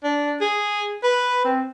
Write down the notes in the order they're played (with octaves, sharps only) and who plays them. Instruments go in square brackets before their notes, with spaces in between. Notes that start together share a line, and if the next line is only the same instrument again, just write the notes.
[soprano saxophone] D4
G#4
B4
C4